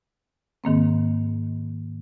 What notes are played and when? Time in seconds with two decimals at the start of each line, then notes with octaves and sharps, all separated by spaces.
0.64 G#2 D#3 A#3 C4